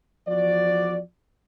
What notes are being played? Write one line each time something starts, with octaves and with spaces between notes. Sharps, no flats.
E2 F3 F#4 D5